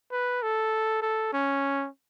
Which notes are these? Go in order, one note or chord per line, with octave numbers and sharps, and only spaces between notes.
B4
A4
A4
C#4